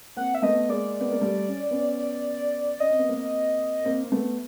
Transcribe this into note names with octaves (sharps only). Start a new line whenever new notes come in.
A#3 C4 F#5
E5
A3 B3 D#5
G#3 A#3 D5
B3
A#3
G3 A3
C#4
B3 C#4
C#4 D#5
C4
B3
A#3 C4
A#3 C4
C4
A3 B3